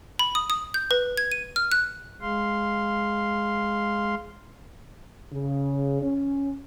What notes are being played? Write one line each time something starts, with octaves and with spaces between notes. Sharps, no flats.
B5
D#6
D#6
G6
B4
G#6
D#7
F6
F#6
G#3 F5 C6
C#3
C#4